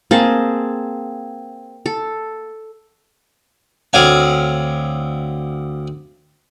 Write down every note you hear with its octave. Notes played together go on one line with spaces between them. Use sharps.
A#3 C4 G#4 A5
A4
D2 C4 C#5 F5 G#5